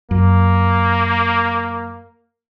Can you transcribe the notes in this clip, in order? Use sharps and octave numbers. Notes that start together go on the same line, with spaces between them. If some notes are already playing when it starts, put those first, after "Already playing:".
F#2 A#3